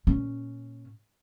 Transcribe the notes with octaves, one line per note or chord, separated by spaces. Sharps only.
A#2 C#4